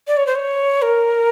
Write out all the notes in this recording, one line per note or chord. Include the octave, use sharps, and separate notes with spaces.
D5
C#5
C5
C#5
A#4